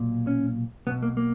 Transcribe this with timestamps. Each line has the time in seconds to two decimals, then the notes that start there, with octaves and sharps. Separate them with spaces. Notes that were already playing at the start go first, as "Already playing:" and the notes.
Already playing: B1 A#2
0.27 C#4
0.87 B1 B2 B3
1.03 A#3
1.17 A#3